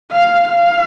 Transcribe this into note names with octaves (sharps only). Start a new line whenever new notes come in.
F5
F5